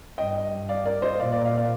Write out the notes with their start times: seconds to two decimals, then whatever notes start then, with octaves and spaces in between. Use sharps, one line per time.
0.18 G2 D#5 G5
0.69 D5 F5
0.85 A#4 D5
1.02 C5 D#5
1.19 A#2 D5 F5
1.32 D5 F5
1.45 D5 F5
1.57 D5 F5